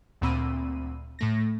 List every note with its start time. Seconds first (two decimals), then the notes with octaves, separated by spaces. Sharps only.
0.21 D2 A#2 C4 B5 E6 D#7
1.19 A2 A3 A#6